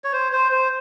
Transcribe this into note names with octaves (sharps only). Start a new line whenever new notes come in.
C#5
C5
C5
C5